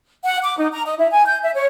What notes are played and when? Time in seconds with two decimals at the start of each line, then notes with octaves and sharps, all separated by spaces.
0.25 F#5
0.43 D6
0.58 D#4
0.72 A#5
0.86 D#5
0.99 E4
1.12 G#5
1.25 G6
1.43 E5
1.55 C#5